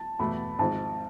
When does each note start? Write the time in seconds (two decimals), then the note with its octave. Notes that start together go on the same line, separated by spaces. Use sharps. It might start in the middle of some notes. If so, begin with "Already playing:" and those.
Already playing: A5
0.19 E2 B2 A3 B5
0.59 G#1 G#2 F3 G#3 A5